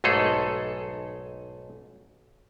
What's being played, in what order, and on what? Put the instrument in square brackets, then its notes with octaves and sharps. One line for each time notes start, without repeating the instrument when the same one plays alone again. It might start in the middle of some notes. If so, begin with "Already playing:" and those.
[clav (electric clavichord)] B1 G#2 A3 G#4 A4